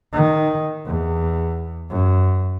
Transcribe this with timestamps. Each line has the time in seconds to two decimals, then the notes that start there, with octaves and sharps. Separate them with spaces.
0.13 D#3
0.86 E2
1.90 F#2